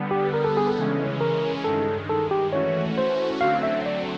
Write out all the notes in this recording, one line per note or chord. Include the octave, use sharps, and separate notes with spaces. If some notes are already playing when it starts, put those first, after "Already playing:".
Already playing: D3 G3 B3
G4
A#4
A4
G#4
A4
C#3 E3 G#3 C#4
A#4
G2 D#3 G#3 A4
A4
G4
E3 A3 C#4 F#4 C#5
C5
D3 F#3 A3 C4 F5
E5
D5